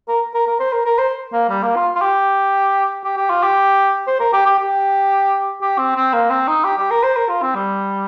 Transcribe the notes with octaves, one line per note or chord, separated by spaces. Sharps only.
A#4
A#4
A#4
C5
A#4
A#4
C5
A#3
G3
A#3
F4
F4
G4
G4
G4
F4
G4
C5
A#4
G4
G4
G4
G4
C4
C4
A#3
C4
D#4
G4
G4
A#4
C5
A#4
F4
C4
G3